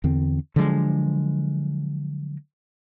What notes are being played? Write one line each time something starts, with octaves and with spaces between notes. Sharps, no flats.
E2 D3 C4
D3 F3 F#3 G#3